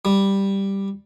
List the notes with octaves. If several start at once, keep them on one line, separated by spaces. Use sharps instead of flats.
G3